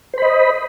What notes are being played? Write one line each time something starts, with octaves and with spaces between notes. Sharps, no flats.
C5 D#5 B5